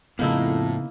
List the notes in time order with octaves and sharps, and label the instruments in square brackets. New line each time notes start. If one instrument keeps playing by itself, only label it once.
[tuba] F2 [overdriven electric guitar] A2 [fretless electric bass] C#3 B3 [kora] A#3 D#4 E4